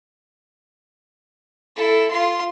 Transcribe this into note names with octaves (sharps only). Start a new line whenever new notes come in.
E4 A4
F4 C6